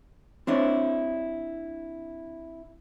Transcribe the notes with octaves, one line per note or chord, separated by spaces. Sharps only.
C4 D4 E4 C#5